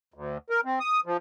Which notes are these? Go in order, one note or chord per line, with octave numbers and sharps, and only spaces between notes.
D2
A#4
C4
D#6
F3